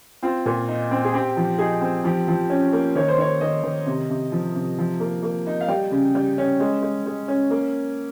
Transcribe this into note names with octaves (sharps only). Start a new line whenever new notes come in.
C4 F4
A#2
D#4
C4
G#4
C4 G4
F3
D#4 G#4
C4
F3 G4
F3
C#4
A#3
D#3 C#5
C5
D#3 C#5
D#3 D#5
D#3
C3
C3
F3
C3
F3
A#3
A#3
D#4
F5
G3 G5
C#3
G3
C#4
G#3
G#3
G#3
C#4
A#3